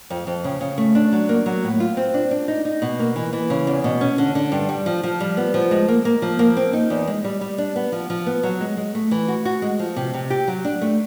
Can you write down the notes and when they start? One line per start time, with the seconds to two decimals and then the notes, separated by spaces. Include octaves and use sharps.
0.10 F2
0.27 F2
0.44 C#3
0.61 C#3
0.78 A3
0.95 D4
1.12 F#3
1.29 A#3
1.46 F#3
1.63 A2
1.80 F4
1.97 C4
2.14 D4
2.31 D4
2.48 D#4
2.65 D#4
2.82 B2
2.99 A#3
3.16 E3
3.33 E3
3.50 C#3
3.67 E2
3.84 B2
4.01 C#4
4.18 D3
4.35 D3
4.52 G2
4.69 G3
4.86 F3
5.03 F3
5.20 G3
5.37 B3
5.54 F3
5.71 G#3
5.88 A#3
6.05 A#3
6.22 F3
6.39 A#3
6.57 C4
6.73 D#4
6.90 E2
7.08 G#3
7.24 G3
7.41 G3
7.58 D4
7.76 B3
7.92 F3
8.10 F3
8.27 B3
8.43 F#3
8.61 G#3
8.77 G#3
8.95 A3
9.11 E3
9.28 F#4
9.45 F#4
9.62 G#3
9.79 F3
9.96 C3
10.14 C3
10.30 G4
10.48 F#3
10.65 D4
10.81 A3